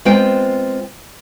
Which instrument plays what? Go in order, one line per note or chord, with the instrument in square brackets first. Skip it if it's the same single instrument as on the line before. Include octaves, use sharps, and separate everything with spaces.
[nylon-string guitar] G#3 B3 C4 F4 C5 G5